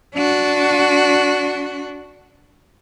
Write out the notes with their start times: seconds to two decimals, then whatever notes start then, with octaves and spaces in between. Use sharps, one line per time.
0.15 D4 F#4